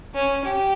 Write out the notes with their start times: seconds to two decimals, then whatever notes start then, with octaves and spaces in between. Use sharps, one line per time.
0.14 C#4
0.44 G4